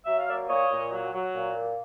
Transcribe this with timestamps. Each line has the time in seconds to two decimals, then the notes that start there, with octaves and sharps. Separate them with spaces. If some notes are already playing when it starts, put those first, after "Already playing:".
0.06 F#3 E5
0.18 F5
0.28 A#3 D5 E5
0.49 A#2 C#5 D#5
0.71 A#2
0.92 F#3
1.13 F#3
1.34 A#2
1.56 A#3